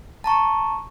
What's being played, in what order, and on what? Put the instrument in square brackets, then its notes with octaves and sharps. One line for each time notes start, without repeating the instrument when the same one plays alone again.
[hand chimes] A5 A#5 C#6